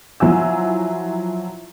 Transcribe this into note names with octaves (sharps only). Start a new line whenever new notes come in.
F3 F#3 E4 G#5 E6